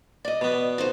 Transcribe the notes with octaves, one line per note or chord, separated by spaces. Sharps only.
D5 D#5
B2 B3
D3 D#4 C5